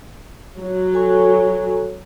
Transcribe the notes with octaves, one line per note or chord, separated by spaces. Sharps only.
F#3
A4 G#5 C#6